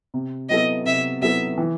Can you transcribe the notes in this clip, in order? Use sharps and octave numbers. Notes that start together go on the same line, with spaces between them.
C3
F#3 B3 E4 A4 D#5
C3 E5
F#3 B3 E4 A4 E5
E3